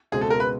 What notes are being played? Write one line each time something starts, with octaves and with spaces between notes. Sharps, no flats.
C#2 B2 G#3 C4 G#4
A4
A#4
B4